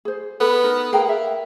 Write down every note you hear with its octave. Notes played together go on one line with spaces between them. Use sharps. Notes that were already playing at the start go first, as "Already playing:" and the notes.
G#4 C5
B3 A4 B5
D#4 A#4
A#3 G#4 G5 A#5
E5